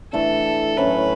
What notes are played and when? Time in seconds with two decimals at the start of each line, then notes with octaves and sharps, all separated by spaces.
0.13 E3 A3 D4 A4
0.77 A2 F#3 A3 C#4 B4